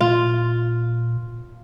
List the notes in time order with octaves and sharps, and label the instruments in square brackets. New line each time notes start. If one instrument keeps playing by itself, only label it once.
[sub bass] A#2 [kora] F4